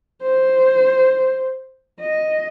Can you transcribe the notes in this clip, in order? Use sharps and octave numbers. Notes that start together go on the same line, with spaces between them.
C5
D#5